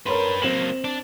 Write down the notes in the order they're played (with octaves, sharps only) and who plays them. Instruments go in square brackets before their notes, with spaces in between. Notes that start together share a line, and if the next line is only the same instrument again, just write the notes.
[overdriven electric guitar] D4 B4 [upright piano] A#4 C#5 C6
[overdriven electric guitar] F#3 A#3 [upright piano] C4 E7 F#7
[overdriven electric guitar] D4